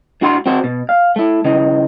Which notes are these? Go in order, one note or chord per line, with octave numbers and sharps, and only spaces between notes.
A2 D4 F#4 F#5 B5 C6
C4 F#4 C5
B2
F5
A3 E4
C#3 E3 D#4